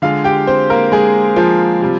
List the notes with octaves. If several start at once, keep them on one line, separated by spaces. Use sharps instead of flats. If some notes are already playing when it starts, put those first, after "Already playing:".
D3 G#3 F4 F5
G4 G5
C4 C5
A#3 A#4
G#3 G#4
F3 F4
C3 G3